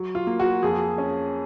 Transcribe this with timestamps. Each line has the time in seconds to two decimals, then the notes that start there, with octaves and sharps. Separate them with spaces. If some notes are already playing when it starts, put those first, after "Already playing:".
Already playing: F#3
0.15 F4
0.27 A#3
0.40 F#4
0.63 F2 G#4
0.98 C#4